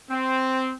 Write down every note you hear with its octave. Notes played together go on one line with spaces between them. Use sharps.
C4